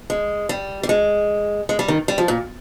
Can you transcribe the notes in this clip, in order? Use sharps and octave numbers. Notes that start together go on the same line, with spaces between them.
G#3
G3
G3
G#3
G#3
G3
D#3
G3
F3
A#2